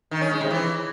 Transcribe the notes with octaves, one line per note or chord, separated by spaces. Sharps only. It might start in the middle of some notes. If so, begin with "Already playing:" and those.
D#3
C#4
G#3
C3
E3